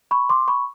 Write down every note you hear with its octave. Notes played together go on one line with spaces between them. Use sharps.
B5 C#6
C6 D6
B5 C#6